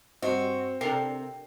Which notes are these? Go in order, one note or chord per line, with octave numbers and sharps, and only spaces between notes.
G2 C4 F#4 D#5
C3 D4 A4 A#4 G5 C7